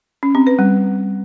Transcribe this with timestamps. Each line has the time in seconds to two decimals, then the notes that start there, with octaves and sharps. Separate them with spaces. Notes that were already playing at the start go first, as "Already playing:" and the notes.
0.23 C#4
0.35 C4
0.47 B4
0.59 G3